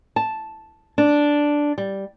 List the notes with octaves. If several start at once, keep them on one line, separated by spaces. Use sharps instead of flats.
A5
D4
G3